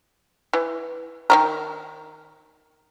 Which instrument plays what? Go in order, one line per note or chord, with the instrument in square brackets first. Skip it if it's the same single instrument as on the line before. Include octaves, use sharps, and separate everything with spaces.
[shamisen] E3
D#3 G3 A#4